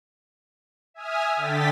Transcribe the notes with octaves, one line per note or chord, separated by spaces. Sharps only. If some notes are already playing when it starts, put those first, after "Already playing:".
E5 G#5 D#6 F6
D3 G5 A6 B6